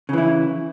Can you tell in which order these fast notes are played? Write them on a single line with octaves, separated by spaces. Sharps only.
C#3 E3 E4